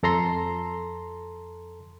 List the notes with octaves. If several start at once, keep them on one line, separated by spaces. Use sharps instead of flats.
F2 A4 A#5 C6